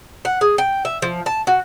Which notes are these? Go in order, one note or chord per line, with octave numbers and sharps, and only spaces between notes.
F#5
G#4
G5
E5
F3
A5
F#4